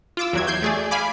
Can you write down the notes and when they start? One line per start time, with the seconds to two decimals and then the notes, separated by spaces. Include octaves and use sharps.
0.17 F4 D6 E6
0.33 E2 F#3 G#6
0.47 G6 G#6 C7
0.62 A3 G#4 D5
0.91 F5 G#5 B5 D6